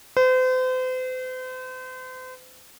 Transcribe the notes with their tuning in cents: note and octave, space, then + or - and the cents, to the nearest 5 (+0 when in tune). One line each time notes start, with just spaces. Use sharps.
C5 -40